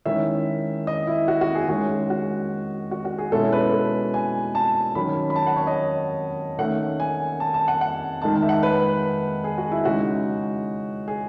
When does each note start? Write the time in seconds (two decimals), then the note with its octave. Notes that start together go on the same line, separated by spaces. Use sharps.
0.06 D#3 G#3 C#4 E4 E5
0.87 D#5
1.07 E4
1.28 F#4
1.41 F#4
1.55 G#4
1.68 D#3 G#3 C#4 F#4
2.10 F#4
2.91 F#4
3.05 F#4
3.18 G#4
3.32 B2 G#3 C#4 E4 A4
3.53 B4
3.73 A4
4.14 G#5
4.55 A5
4.95 D#3 F#3 C#4 B5
5.30 B5
5.36 A5
5.47 F#5
5.56 C#5
5.67 D#5
6.58 D#3 A3 C#4 F#5
7.00 G#5
7.40 A5
7.54 A5
7.68 F#5
7.81 F#5
8.22 D#3 G#3 D#4 A5
8.35 A5
8.42 E5
8.49 F#5
8.63 B4
9.44 G#4
9.58 F#4
9.72 E4
9.85 C#3 G#3 D#4 F#4
11.08 G#4